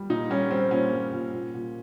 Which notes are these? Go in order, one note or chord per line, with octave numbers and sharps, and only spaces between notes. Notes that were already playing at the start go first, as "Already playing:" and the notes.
Already playing: G3
A#2 D#4
G3 C#4
G3 C4
A#2 C#4
G3
A#2
A#2
A#2